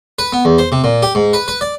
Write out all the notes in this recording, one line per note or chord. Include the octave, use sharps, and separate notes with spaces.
B4
B3
E2
C5
C3
A#2
G4
G#2
B4
B4
D5